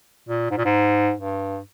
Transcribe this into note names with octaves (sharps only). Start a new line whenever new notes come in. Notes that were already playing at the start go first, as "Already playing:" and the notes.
A#2
G#2
A#2
G#2
G2